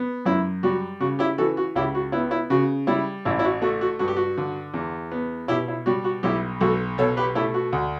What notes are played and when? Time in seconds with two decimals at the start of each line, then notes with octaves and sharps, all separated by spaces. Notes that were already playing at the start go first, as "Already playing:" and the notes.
Already playing: B3
0.26 F#2 E4
0.63 G3 F#4
1.00 C#3 F#4
1.19 E4 G4
1.38 E3 F#4 A4
1.57 F#4
1.75 C#2 E4 G4
1.95 F#4
2.12 B3 E4
2.31 E4
2.50 C#3 F#4
2.87 G3 E4
3.25 A1 E4
3.39 E4
3.44 F#4
3.62 A3 F#4
3.81 F#4
3.99 G2 F#4
4.08 G4
4.17 F#4
4.37 D3
4.74 E2
5.11 B3
5.48 B2 E4 G4
5.68 E4
5.86 G3 F#4
6.04 F#4
6.23 B1 E4 G4
6.61 B1 F#4 A4
6.98 B2 A4 C#5
7.17 G4 B4
7.35 A3 E4 G4
7.54 F#4
7.73 D2